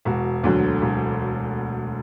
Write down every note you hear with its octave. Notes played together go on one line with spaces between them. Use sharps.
E1 F#4
D2 D3 F#3
E1